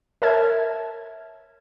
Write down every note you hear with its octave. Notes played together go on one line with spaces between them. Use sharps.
A#4 C#5 E5 A5 F6 G#6